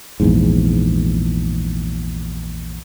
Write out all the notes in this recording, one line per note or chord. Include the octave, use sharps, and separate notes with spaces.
A#1 E2 G#2